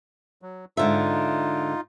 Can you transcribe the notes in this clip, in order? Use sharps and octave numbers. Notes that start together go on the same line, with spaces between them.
F#3
G#2 D3 D#4 F4 E5